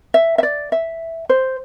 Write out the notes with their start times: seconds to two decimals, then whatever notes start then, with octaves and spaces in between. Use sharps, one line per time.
0.14 E5
0.38 E5
0.43 D5
0.72 E5
1.29 C5